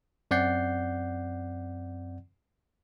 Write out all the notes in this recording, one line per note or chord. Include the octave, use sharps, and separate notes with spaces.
F#2 C4 D5 F#5 G6 C7